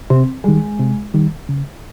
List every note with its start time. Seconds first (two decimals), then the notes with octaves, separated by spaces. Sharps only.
0.10 C3 C4
0.44 D#3 G3 G#3
0.79 C3
1.14 D#3 G3
1.49 C#3